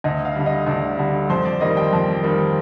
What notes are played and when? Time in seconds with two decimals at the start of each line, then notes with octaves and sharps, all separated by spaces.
0.04 D2 D#5
0.25 F5
0.36 D3 G3
0.46 D#5
0.67 D2 D5
0.98 D3 G3
1.30 F2 C5
1.45 D5
1.61 D#3 G3 A#3 D#5
1.77 G5
1.93 F2
2.23 D#3 G3 A#3